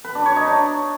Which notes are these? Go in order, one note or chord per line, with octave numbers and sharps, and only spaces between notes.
B4
D4
C#5
D#4
D4